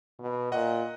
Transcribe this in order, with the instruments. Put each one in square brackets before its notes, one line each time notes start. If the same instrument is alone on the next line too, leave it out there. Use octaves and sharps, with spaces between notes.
[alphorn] B2
[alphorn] A#2 [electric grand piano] D#5 F#5